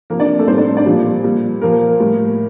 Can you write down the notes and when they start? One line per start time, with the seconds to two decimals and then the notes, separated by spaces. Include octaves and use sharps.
0.10 F3 A#3 A#4
0.13 C3
0.20 D4 D5
0.39 A3 A4
0.48 A2 G3 C4 C5
0.58 D4 D5
0.77 D4 D5
0.86 A#2 F3 G3 G4
1.24 A#2 G3
1.62 A#2 F3 A#3 A#4
2.00 A2 G3